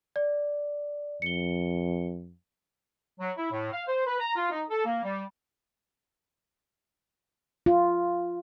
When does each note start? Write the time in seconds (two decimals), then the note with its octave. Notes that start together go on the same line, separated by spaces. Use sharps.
0.16 D5
1.22 F2 C#7 G7
3.20 F#3
3.36 E4
3.51 A2
3.72 F5
3.87 C5
4.06 B4
4.20 A#5
4.35 F4
4.51 D#4
4.69 A4
4.85 A#3
5.03 G3
7.66 F4